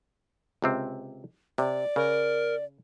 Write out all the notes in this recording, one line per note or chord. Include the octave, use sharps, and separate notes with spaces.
C#2 C3 C4
C3 D5
C#3 A#4